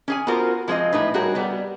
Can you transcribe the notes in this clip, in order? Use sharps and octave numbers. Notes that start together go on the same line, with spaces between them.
C#4 G#4 G#5
B3 F4 F#4 A#4 C5
F3 G#3 C4 C#5 D#5
A2 D#4 B4
G3 F#4 G#4 A#4 C#5
G3 B3